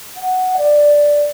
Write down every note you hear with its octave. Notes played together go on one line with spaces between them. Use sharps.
F#5
D5